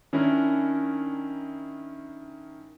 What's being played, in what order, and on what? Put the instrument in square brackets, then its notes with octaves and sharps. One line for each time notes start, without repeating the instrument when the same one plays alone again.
[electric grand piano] D#3 C#4 D4 E4 A#4